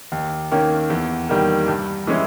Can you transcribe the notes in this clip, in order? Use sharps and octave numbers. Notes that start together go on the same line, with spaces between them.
D#2
D#3 A#3 C#4
E2
D#3 G3 A#3
G2
E3 G#3 C#4 E4